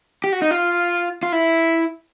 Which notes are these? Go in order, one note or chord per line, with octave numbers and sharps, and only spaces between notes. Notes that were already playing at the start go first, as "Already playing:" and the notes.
G4
F#4
D#4
F4
F4
E4